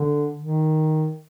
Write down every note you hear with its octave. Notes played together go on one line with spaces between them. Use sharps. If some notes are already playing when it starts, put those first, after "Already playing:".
Already playing: D3
D#3